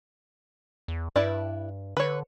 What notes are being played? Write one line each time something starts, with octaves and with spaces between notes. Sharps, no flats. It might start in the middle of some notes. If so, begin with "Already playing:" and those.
E2
G2 E4 B4 D5
D3 B4 C#5